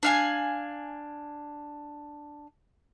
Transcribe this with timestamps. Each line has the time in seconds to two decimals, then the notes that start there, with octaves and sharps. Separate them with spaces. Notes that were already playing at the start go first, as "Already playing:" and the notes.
0.03 D4 F5 G#5